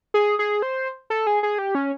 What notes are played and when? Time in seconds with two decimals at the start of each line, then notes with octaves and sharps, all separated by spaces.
0.14 G#4
0.39 G#4
0.62 C5
1.10 A4
1.27 G#4
1.43 G#4
1.58 G4
1.75 C#4